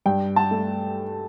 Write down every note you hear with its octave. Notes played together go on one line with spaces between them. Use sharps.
G2 G5
A5
A3